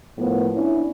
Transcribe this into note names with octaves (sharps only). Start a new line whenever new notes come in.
A2 F3 A#3 B3
C#4 D4 E4